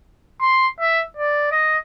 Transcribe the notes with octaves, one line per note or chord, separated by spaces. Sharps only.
C6
E5
D5
D#5